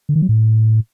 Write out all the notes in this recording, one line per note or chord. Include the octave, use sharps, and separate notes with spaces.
D3
D#3
F#3
A2